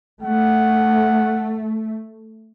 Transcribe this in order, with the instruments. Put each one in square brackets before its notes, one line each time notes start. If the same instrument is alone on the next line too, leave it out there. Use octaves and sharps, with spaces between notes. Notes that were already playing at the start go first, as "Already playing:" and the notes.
[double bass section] A3 [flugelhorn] F#5